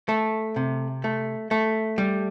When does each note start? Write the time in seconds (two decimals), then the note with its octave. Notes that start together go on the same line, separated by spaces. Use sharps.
0.09 A3
0.56 C3
1.04 A3
1.51 A3
1.98 G3